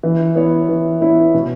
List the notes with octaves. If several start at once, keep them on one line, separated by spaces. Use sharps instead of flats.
E3
B3 E4 C#5
E3
B3 E4 C#5
B2